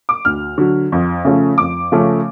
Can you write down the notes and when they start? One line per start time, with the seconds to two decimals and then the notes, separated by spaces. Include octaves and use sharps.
0.09 D6
0.25 D2 F6
0.58 D3 F#3
0.92 F2
1.25 C#3 F3 A3 C#4
1.58 F2 D6
1.92 C#3 F3 A3 C#4